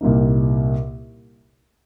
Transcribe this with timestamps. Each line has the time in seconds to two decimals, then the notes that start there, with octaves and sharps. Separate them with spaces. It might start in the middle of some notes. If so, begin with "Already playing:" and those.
0.01 C2 A#2 G3 A#3 D#4